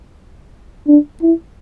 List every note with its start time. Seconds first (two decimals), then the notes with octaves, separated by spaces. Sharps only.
0.88 D4
1.22 E4